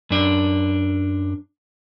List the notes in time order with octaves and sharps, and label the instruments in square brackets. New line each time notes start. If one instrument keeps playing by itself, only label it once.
[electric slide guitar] F#2 D4